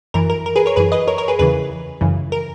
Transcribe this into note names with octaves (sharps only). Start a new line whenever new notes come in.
F#2 E3 A#4
A#4
A#4
G#4 B4
A#4 C#5
F#2 E3 G#4 B4
B4 D#5
A#4 C#5
A#4 C#5
G#4 B4
E2 C#3 E3 G#4 B4
F#2 C#3 E3
A#4